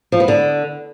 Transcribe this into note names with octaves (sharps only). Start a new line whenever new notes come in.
F3
B3
D3